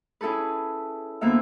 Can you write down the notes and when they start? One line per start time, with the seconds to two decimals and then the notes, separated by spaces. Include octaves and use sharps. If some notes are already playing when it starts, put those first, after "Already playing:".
0.21 C#4 E4 G#4 A4 B4
1.21 D2 A#3 B3 E5